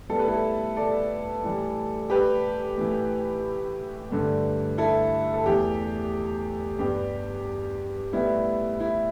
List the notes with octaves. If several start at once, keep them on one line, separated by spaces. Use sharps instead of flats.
A2 G3 B3 A4
B4
E4 A4
A4 D5
A2 E3 G3
G4 B4
A2 E3 A3
G2 D3 A3
E4 A4
A4
E2 E3 A3 G4
G2 G3 B3 G4
A2 G3 B3 E4
E4